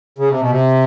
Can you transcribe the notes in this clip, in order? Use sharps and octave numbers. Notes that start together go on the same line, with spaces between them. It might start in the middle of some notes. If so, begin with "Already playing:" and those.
C#3
C3
B2
C3